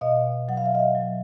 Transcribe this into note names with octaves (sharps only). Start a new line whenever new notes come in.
B2 D#5 F5
F#3 F#5
F5
E5
D#5 F5
F#3